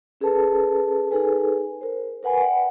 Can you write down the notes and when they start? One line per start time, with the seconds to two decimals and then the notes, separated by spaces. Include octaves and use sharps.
0.21 C#4 G#4 A4 B4 A5
1.11 D#4 G#4 A4 B4 G#5
1.81 A#4 C5
2.23 A#4 B4 F#5 G#5 B5
2.41 D5 F#5 G5 B5